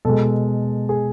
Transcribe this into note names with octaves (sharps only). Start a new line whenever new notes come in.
B2 G#3 A4
G#4